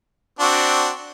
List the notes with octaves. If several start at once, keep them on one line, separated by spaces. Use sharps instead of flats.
C4 D4 F#4